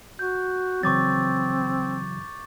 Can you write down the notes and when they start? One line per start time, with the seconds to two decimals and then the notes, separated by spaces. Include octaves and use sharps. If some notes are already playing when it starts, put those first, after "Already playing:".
0.19 F#4 G6
0.83 C#3 E3 F#3 C4 C#6 D6 A6